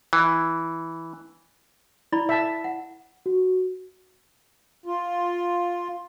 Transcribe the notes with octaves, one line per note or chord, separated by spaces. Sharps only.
E3
E4 D5 B5
E5 A5
F#5
F#4
F4